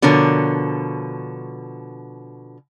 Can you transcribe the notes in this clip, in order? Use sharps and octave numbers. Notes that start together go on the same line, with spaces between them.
B2 D3 F3 A#4 C#5